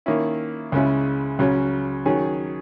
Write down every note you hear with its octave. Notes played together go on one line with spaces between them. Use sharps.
D#3 A#3 C#4 E4
C#2 C#3 G#3 C#4 E4
C#2 C#3 F#3 C#4
D#3 F#3 C#4 G#4